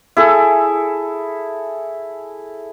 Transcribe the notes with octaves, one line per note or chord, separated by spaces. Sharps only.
E4 G#4 A4